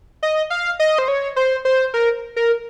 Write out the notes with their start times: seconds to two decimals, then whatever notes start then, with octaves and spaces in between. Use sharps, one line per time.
0.23 D#5
0.50 F5
0.79 D#5
0.98 C5
1.08 C#5
1.36 C5
1.65 C5
1.94 A#4
2.36 A#4